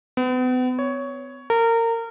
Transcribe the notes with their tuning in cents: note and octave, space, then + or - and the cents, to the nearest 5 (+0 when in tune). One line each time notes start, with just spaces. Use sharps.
B3 +40
C#5 +10
A#4 -25